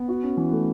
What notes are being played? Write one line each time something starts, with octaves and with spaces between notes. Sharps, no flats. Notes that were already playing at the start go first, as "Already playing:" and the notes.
Already playing: B3
F#4
C#4
E3
A3